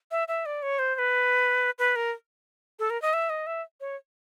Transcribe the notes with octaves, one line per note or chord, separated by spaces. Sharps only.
E5
E5
D5
C#5
C5
C5
B4
B4
A#4
A4
A#4
D#5
E5
D#5
E5
C#5